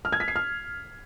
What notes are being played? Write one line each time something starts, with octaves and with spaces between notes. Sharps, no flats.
F6
G#6
B6
C7
F6